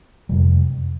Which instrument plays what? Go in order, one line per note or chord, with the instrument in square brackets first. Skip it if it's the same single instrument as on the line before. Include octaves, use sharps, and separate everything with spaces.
[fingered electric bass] F2 C3 G3